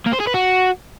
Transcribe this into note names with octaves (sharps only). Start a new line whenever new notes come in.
A#3
C5
G#4
B4
F#4